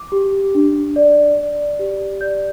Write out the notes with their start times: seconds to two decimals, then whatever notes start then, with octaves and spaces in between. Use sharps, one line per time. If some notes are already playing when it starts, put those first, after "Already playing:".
Already playing: D6
0.12 G4
0.55 D4
0.96 D5
1.37 D5
1.79 G4
2.21 D5 G6